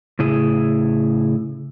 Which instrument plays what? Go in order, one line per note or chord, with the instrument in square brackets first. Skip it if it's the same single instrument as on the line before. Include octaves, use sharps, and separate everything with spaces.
[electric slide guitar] A2 C#3 E4 G#4